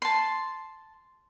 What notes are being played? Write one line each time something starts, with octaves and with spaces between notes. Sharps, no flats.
A5 C6